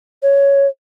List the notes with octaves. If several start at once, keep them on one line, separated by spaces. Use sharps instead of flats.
C#5